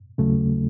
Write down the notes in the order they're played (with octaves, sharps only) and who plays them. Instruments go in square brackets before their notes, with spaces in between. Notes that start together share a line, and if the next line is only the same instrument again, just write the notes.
[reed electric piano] D#2 C#3 F#3 A3